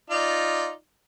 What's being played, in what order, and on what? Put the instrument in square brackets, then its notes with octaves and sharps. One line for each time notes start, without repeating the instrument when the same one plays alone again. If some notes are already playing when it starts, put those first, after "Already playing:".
[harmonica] D#4 F4 D5